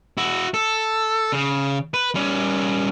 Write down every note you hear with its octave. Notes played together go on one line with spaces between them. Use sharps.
E4 F#4
A4
C#3
B4
G3 C#4